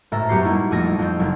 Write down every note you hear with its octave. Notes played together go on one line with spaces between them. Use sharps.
G#1 A2 A4 E5 A#5
F#2 B3 G4 C#6 G6 C7
G3 A#3 B3 D#4 E4
A#1 F2 A3 D#6 G#6 A#6
F2 G6
F#1